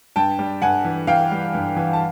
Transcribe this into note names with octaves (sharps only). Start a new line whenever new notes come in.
G2 G5 A5
G3
G2 F#5 G#5
E3
E3 F5 G5
G3
G2
E3
A5